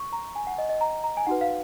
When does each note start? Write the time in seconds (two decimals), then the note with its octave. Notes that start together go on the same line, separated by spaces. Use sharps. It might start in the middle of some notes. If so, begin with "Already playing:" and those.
Already playing: C#6
0.13 A#5
0.35 G#5
0.47 F#5
0.58 D#5
0.69 D#5
0.81 A#5
1.04 A#5
1.17 G#5
1.27 D#4 F#4 B4 F#5
1.41 F5